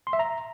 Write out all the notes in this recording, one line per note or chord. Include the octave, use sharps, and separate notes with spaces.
C6
E5
A#5